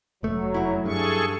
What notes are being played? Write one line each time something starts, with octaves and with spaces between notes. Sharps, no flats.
F1 F#3 A3
F#2 E4
G2 G#4 A4 C#6